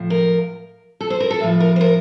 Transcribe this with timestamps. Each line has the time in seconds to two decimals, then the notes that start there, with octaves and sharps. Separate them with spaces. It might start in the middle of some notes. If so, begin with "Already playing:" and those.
Already playing: A2 F3
0.10 A#4
1.01 A4
1.10 C5
1.20 A#4
1.30 A4
1.40 A2 F3
1.60 A#4
1.76 C5
1.81 A#4